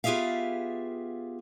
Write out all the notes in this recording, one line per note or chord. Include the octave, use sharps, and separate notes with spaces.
B3 F4 G4 G#4 E5 F5